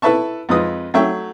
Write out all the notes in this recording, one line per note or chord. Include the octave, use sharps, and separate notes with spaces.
E4 A4 B4 E5 A5 C#6
F2 G#3 F4 B4 D#6
F#3 A3 E5 G5 C#6